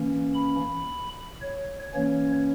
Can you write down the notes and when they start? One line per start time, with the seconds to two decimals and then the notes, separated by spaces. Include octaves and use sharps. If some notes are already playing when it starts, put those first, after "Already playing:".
Already playing: E3 A#3 C#4
0.34 B5
1.41 C#5
1.94 E3 A#3 C#4 C#5